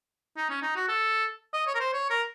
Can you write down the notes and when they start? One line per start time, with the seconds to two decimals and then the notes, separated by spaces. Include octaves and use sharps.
0.37 D#4
0.50 C#4
0.62 D#4
0.76 F#4
0.88 A4
1.54 D#5
1.67 C#5
1.75 A#4
1.80 C5
1.93 C#5
2.10 A#4